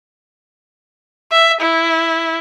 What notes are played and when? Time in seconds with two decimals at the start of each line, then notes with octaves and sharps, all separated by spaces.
1.32 E5
1.62 E4